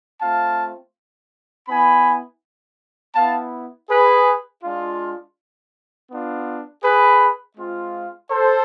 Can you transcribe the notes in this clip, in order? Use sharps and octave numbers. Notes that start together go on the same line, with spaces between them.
A3 C4 F4 F5 A5
B3 E4 G#5 B5
B3 E4 F5 A5
G#4 B4
G#3 D4 F4
B3 D4 F4
G#4 B4
G#3 C4 F4
A4 C5